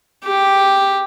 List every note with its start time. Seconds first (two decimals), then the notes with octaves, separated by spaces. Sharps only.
0.24 G4